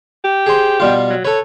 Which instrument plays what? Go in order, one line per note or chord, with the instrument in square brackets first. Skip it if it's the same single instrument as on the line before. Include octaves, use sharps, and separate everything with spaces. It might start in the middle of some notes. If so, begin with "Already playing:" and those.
[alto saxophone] G4
[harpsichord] G#4 C5
B2 G3 F4
[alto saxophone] F#3
[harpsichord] A4 B4 [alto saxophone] C#5